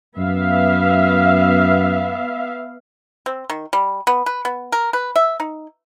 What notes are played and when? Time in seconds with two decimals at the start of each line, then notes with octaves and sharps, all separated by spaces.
0.17 F#2 B3 E5 F5
3.26 C4
3.50 D#3
3.73 G3
4.07 B3
4.26 B4
4.45 B3
4.72 A#4
4.93 B4
5.16 E5
5.40 D#4